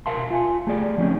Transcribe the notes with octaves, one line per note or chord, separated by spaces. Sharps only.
B1 A#4 E5 F5 A5 C6
F4 G#5 C6
A3 G#4 D5
F3 C4 C#4 D#4